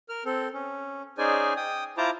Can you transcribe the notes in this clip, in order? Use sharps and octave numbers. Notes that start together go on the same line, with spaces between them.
A#4 F6
C4 A4
C#4
C#4 D#4 G#4 C5 D5 G#5
G5 D#6
E4 F4 C5 A5 A#5 D6